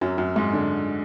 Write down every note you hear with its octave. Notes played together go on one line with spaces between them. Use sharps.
F#2 F#3
F#2 F#3
G#2 G#3
D3 D4